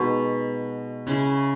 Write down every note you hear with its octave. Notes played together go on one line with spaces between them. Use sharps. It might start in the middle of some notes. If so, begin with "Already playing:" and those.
Already playing: B2 G#3 D#4 F#4
C#3 G#3 C#4 E4